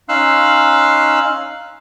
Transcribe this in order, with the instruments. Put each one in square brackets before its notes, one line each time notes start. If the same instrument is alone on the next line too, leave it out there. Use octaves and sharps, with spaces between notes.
[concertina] C#4 D#4 F5 C6 E6 F#6